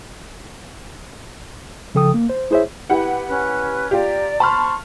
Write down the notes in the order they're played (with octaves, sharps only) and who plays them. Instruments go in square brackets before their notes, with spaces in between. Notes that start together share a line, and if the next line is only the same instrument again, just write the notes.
[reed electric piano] C#3 F3 A4 G5 D#6
A#3
C5
E4 G#4 C5 C#5 E5
[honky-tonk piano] E4 G4 F#5 [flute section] B4
[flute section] C#4 B4 F#6
[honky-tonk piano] F4 G4 [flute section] D5 A#5
[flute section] C5 C#6 [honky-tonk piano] A5 B5 F6